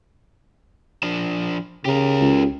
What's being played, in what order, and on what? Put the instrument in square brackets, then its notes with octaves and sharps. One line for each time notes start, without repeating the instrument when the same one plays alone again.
[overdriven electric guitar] F3 D4
[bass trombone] C#3 [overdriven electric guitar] G4 A#4
[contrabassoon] C#2